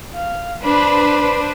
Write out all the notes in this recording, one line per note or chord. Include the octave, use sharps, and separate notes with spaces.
F5
D4 B4 C5 B5